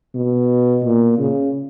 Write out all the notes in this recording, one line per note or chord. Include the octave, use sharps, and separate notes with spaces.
B2
A#2
C#3